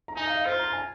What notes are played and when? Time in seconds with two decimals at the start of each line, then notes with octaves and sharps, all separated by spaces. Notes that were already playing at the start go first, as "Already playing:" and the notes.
0.08 A#5
0.16 D#4 G#5
0.27 F5
0.36 D#5
0.46 F4 C5
0.59 A#5
0.73 G#5